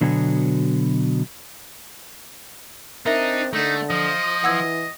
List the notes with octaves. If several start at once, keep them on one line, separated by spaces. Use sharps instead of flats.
B2 D3 F#3 B3 G#5
C4 D4 D#4 A#4 E5 A#6
D3 A3 D#4
F3 D#5
E3 F#5 E6 G#6